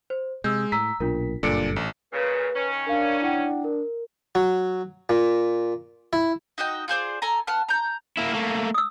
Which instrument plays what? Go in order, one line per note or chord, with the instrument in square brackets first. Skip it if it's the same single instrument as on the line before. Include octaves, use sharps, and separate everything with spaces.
[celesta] C5
[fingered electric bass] C3 [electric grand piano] G#3 [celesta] E6 G6
[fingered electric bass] A2 [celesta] A#5 E6 [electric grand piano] B6
[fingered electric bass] B1 A#2 [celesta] D4 F4 A#4
[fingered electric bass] F#1 G2 [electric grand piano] A#2 D4 [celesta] A4 C#7 D7
[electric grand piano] A1
[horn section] A#2 C#3 [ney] B4
[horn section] D#3 C#4
[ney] D4 [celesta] A#4 F5
[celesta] E4 F#5 G5
A#4
[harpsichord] F#3
A#2
E4
[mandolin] D#4 F#4 D#5 G5
F4 G#4 C5 D5
A4 G#5 A#5
B4 F#5 A5 F6
A#5 G6
[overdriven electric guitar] A#3 E4
A3 A#3
[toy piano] D#6 E6